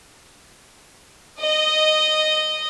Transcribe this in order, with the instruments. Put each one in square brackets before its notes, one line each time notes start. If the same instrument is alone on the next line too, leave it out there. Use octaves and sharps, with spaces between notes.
[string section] D#5